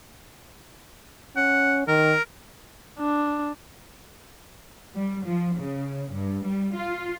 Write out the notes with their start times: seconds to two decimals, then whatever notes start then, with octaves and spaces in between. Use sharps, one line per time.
1.36 C#4 F#5
1.88 D#3 A#4
2.99 D4
4.96 G3
5.26 F3
5.58 C#3
6.13 G2
6.46 G3
6.77 F4